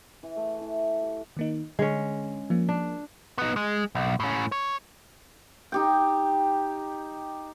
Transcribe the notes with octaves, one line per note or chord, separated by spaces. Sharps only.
E3
A3
E3
G4
D#3 A#3 D#4
D3 G#3 C#4
F3 A#3
D4
B3 D#4
G#3
B1
A2 C#4
C#5
D#4 G4 G5